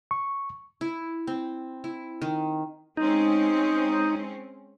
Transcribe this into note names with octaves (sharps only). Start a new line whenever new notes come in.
C#6
E4
C4
E4
D#3
G#3 C4 C#4 D#4